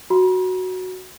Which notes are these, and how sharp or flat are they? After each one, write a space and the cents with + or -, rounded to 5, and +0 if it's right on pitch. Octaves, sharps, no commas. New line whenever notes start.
F#4 +0 A#5 +45